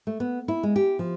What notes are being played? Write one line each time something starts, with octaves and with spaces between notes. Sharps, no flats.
A3
B3
E4
G#3
G4
F3